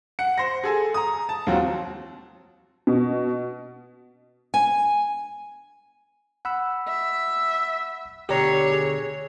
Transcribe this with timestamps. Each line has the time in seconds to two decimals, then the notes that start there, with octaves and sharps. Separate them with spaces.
0.19 F#5 C#7
0.38 C5 A#6
0.64 G#4 A4 G#5
0.94 A#5 D#6
1.29 A5
1.47 D#2 F#3 C4 F4
2.87 B2
4.54 G#5
6.45 F#5 B5 E6
6.88 E5
8.29 D2 B2 D3 G4 C#5 D5 A#5
8.72 G#4